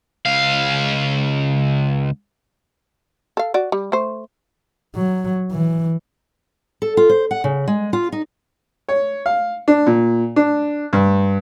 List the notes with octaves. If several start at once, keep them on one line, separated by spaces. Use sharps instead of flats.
C#2 F5
A4 F5
F#4 D5
G3
A3 C5
F#3
E3
A4
F4
C5
F#5
C#3
G#3
F4
D#4
C#5
F5
D4
A#2
D4
G2